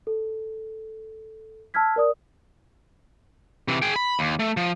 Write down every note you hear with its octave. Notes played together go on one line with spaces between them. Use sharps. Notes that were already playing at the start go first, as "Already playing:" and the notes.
A4
A5 E6 F6 G#6 B6
A#4 D5 D#6
C3 E3
G#4 G5
B5
D#2
A3
F3